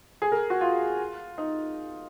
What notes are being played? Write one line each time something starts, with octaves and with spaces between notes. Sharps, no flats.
G#4
A#4
F#4
F4
D#4